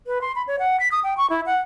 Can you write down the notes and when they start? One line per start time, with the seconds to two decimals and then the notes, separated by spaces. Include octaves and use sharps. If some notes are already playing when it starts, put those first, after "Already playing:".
0.07 B4
0.21 C6
0.36 B5
0.47 C#5
0.59 F#5
0.80 B6
0.92 D#6
1.04 G5
1.17 C#6
1.30 E4
1.46 F#5